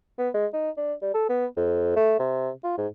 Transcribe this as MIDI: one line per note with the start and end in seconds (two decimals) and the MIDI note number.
0.19 0.29 59
0.34 0.47 56
0.54 0.70 63
0.77 0.94 62
1.02 1.10 55
1.14 1.27 69
1.29 1.46 59
1.57 1.92 41
1.96 2.17 57
2.19 2.50 48
2.64 2.76 65
2.78 2.87 44